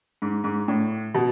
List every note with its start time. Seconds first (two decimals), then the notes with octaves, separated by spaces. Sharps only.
0.22 G#2
0.44 G#2
0.68 A2
1.15 B2